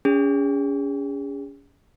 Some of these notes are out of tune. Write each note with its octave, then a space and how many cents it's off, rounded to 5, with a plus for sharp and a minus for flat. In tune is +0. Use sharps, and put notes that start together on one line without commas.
C#4 +35 G#4 -35